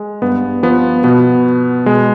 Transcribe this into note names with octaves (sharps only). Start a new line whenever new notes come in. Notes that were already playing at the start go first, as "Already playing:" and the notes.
Already playing: G#3
G2 B3
F3 B3
B2 B3
B2 G#3